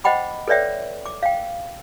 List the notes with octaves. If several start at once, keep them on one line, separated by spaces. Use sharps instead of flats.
C5 D#5 F#5 G5 B5 D6
A4 B4 C#5 D5 E5 G5
D6
F5 G5